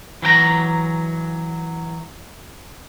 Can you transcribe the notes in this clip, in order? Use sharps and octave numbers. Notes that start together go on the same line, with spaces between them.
E3 F#3 G5 A#5